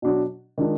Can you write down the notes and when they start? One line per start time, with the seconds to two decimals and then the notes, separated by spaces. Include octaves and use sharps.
0.02 B2 F#3 D4 F#4
0.58 D#3 G#3 D4 F4